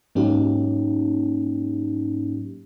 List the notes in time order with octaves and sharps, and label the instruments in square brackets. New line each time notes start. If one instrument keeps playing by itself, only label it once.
[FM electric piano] G#2 F#3 A#3 C#4 D#4 G4